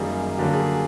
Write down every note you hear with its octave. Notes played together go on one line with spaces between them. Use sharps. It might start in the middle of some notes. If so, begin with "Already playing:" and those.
Already playing: F#2 D#3 G3 A#3 G#4
D3 F#3 A#3 G4
G#4